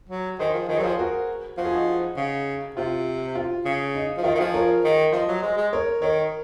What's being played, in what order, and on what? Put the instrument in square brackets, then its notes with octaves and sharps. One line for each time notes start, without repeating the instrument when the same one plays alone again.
[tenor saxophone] F#3
[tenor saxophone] D#3 [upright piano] G#4 C5
[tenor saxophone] F3
[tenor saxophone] D#3 [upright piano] G#4 C5
[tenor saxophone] F#3
[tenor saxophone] F3 [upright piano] G#4 C5
[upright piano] F#4 A#4
[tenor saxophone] F3 [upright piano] F#4
[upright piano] G#4
D#4 F#4
[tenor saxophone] C#3
[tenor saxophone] C3 [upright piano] F4
[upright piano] F4
[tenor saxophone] C#3
[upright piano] D#4
[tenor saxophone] F3
[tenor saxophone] D#3 [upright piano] F4
[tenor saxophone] D#3
[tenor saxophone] F3 [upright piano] F4 G#4
[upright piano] A#4 C#5
[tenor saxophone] D#3
[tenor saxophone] F3 [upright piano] C5 D#5
[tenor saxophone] F#3
G#3
G#3
[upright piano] A#4 C#5
[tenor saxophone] D#3 [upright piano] A#4 C#5